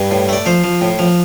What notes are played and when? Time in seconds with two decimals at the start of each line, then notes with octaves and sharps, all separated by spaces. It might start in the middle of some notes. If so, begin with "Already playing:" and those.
Already playing: G2 B4
0.11 A2
0.29 A3 D5
0.46 F3 C5
0.64 F3
0.81 A2
0.99 F3